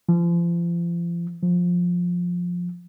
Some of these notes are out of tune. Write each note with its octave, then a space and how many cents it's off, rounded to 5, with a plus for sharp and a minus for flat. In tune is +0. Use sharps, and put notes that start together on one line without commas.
F3 -35
F3 +15